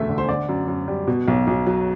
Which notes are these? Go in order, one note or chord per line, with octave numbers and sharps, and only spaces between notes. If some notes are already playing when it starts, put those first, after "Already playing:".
Already playing: E1 D2 A3 E5
D3
C5
D3 D5
F#2
F#2
G3
B2
B1
B1
F#3